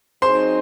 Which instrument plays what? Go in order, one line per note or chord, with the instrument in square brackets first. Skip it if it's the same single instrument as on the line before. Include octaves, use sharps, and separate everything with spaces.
[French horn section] F#3 C4 D#4 G#4 [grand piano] C5 C6